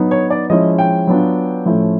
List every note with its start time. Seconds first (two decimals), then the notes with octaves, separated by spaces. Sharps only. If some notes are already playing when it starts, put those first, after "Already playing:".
Already playing: F#3 B3 D#4
0.11 C#5
0.30 D5
0.50 F3 G#3 C#4 E4 D#5
0.78 G5
1.07 F#3 B3 D4 F4
1.65 A2 F3 A3 C#4 E4